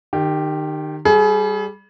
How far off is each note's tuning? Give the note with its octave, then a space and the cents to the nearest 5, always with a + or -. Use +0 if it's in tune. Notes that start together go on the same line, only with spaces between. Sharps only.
D#3 -30 G4 +0
G3 +0 G#4 +35